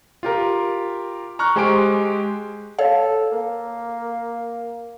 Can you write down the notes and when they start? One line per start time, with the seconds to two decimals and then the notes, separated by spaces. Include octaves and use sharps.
0.23 F4 G4 A#4
1.39 A#5 C#6 F6 F#6
1.56 G#3 G4 C5 G#5 C#6 D7
2.79 A4 C#5 F5
3.32 A#3